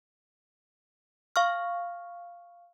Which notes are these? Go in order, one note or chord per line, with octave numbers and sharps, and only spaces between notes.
F5 C#6 F6